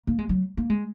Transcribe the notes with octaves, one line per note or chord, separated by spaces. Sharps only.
A#3
G#3
F#3
A#3
G#3